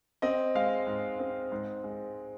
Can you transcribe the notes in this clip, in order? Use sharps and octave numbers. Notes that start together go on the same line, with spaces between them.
C4 D#5
G#3 F5
G#2
C4
G#2
G#3